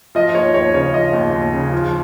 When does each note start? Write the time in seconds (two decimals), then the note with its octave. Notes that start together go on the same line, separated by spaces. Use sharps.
0.15 F3 D#5
0.35 D#2 C#5
0.54 D#2 C#5
0.74 C#3 C#5
0.93 F3 D#5
1.13 D#2
1.33 D#2
1.53 C#3
1.72 F3